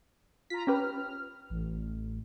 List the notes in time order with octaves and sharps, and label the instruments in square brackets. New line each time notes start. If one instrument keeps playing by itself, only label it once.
[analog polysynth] F4 A#5 [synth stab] B6
[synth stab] C#4 G4 B4 [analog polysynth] F6
[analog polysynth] A1